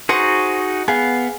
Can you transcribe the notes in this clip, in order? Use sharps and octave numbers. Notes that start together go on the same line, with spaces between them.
D#4 F#4 G#4 C5 C#6
B3 G#4 F5